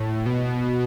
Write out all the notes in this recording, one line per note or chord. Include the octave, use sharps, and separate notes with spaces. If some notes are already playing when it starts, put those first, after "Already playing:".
Already playing: A2
B2